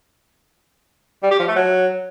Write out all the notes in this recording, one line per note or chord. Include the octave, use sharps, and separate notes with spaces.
G3
G4
F3
A3
F#3